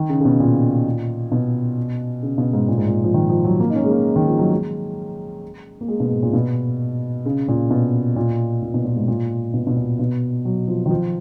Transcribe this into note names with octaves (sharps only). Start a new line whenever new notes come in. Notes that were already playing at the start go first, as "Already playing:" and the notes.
Already playing: D#3
C#3
C#3
B2
A#2
B2
C#3
B2
G#2
A#2
G#2
A#2
F3
D#3
F3
F#3
A#3
D#4
C#4
G#3
A#3
D#3
F3
F#3
G#3
A#3
G#3
B2
G#2
A#2
B2
C#3
A#2
B2
A#2
A#2
B2
A#2
G#2
A#2
B2
B2
A#2
B2
F#3
F3
D#3
F3